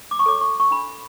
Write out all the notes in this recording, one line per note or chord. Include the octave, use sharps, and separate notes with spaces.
D6
C#6
A4 C#5 D6
C#6
C#6
D4 B5